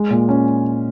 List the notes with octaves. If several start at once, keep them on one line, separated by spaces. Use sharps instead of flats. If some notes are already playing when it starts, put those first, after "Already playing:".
Already playing: G#3
A#2
C#4